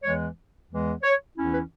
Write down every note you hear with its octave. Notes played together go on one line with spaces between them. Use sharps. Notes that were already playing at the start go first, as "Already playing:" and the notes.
E2 E3 G#3 C#5
E2 E3 G#3
C#5
E2 E3 C#4 E4
B4